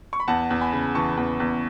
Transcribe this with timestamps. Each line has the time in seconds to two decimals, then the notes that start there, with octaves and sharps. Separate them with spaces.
0.13 C#6
0.20 B5
0.28 E2 F#5 A5
0.50 E2
0.61 G#5 B5
0.73 C#3
0.95 E3 A5 C#6
1.17 E2
1.40 E2